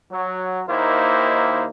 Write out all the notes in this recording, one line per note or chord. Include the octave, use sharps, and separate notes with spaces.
F#3
D#2 D#3 A#3 D#4 E4 C5